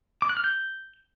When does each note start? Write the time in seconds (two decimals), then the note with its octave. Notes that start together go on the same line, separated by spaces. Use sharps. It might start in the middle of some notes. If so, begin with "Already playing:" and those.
0.22 D6
0.29 F#6
0.37 F6
0.44 G6